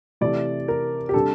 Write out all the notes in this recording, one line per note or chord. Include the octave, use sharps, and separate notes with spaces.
C3 E3 A3 D5
A#4
G4
C3 G3 D4 A4